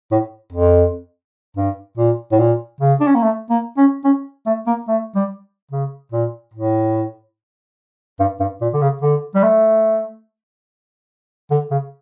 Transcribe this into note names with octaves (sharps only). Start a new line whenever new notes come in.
A2
F2
G2
A#2
A2
A#2
C#3
D4
C#4
A#3
A3
A#3
C#4
C#4
A3
A#3
A3
G3
C#3
A#2
A2
G2
G2
A#2
D3
C#3
D3
G3
A3
D3
C#3